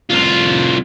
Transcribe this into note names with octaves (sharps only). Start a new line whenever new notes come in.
C2 F4